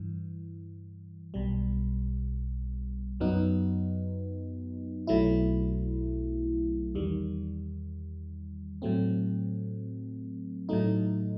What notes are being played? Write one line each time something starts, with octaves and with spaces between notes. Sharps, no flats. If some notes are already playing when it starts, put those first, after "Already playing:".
Already playing: G2 E3
B1 B2 G3
F#2 F#3 B3 D#4
B1 B2 F#3 A3 E4
E2 D#3 G3
A2 F#3 A3 C4
A2 F#3 A3 D#4